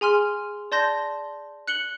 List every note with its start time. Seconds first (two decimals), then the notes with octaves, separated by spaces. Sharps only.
0.01 G#4 G#5 C6 F6
0.72 D5 A5 C6 G6 A#6
1.68 F#6 C#7 F#7 G7